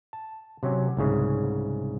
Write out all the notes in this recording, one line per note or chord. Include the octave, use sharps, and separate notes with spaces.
A5
C3 F#3 C4 C#4
C2 G#2 C#3